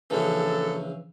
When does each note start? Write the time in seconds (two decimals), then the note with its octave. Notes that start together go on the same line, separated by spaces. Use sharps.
0.10 A#1 F#2 C#3 E3 A4